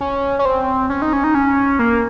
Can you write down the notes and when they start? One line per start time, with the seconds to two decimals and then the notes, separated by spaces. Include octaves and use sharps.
0.01 C#4
0.39 C#4
0.45 C4
0.90 C#4
1.02 D#4
1.13 C#4
1.24 D#4
1.35 C#4
1.79 A#3